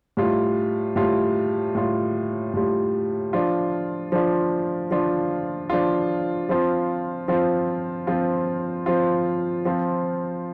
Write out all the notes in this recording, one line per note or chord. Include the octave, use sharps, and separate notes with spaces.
A2 G3 F4
A2 G3 F4
A2 G3 F4
A2 G3 F4
F3 D4 F4
F3 D4 F4
F3 D4 F4
F3 D4 F4
F3 C4 F4
F3 C4 F4
F3 C4 F4
F3 C4 F4
F3 C4 F4